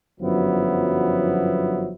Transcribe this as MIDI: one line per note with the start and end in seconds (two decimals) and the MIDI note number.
0.21 1.94 31
0.21 1.94 42
0.21 1.94 53
0.21 1.94 54
0.21 1.94 59
0.21 1.94 64